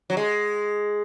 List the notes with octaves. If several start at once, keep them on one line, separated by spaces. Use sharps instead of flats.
F#3
G#3